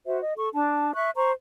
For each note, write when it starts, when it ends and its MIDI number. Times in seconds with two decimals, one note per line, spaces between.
0.07 0.21 66
0.07 0.21 72
0.07 0.21 76
0.22 0.33 75
0.37 0.48 69
0.37 0.48 85
0.53 0.93 62
0.53 0.93 81
0.94 1.11 76
0.94 1.11 85
0.94 1.11 90
1.16 1.31 72
1.16 1.31 82
1.16 1.31 85